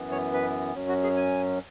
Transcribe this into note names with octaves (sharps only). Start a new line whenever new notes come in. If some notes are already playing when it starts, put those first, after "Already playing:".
Already playing: F#2 E3 B3
C#5
B4
F#2 F#3 C#4
F#4
G#4
G#5